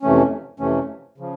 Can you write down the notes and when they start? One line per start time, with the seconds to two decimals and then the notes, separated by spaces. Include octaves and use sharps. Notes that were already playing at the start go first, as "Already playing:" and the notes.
0.03 F2 C3 E3 A3 C#4
0.60 F2 C3 E3 A3 C#4
1.18 C#3 F3